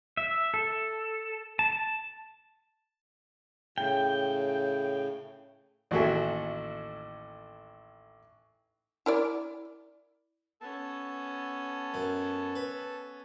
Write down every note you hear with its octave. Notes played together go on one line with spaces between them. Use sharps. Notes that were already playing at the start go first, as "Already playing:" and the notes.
E5
A4
A5
A2 C#3 G5
A1 D#2 F#4 A4 E5 G#5
E4 A#4 D5
B3 C#4 A4 A5
F#2
B4